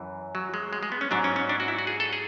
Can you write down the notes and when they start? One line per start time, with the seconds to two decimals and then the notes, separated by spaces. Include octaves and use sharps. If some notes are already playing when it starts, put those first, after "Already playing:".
Already playing: F#2 E3
0.35 F#3
0.54 G#3
0.73 G#3
0.83 G#3
0.92 B3
1.01 C#4
1.11 G#2 F#3 D4
1.24 C#4
1.36 C#4
1.49 D4
1.60 F#4
1.68 E4
1.79 F#4
1.87 G#4
2.00 A4
2.13 G#4